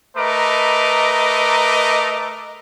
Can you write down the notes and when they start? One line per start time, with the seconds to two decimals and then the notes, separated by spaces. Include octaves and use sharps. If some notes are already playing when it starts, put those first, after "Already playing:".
0.17 A3 A#4 B4 D#5 A#5 D6